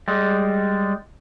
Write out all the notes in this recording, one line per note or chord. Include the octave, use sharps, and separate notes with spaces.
G3 G#3